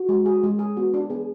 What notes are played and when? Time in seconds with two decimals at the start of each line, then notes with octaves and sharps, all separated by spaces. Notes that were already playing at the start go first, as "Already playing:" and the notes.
Already playing: F#4
0.09 G#3
0.26 G#4
0.43 G#3
0.59 G#4
0.77 B3 F#4
0.94 D4
1.10 B3 G#4